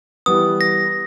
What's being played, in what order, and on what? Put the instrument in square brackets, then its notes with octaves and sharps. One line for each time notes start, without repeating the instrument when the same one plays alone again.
[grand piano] E3 G3 B3 [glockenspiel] D#6
[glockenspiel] A#6